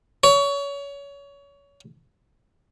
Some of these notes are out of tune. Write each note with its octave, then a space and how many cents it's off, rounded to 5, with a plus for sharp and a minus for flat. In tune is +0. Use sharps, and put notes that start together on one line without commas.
C#5 +25